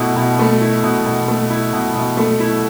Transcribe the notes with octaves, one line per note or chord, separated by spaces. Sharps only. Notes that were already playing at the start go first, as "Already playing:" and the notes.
Already playing: B2 A3 E4
B2
A3
E4
B2
B2
A3
E4
B2
B2
A3
E4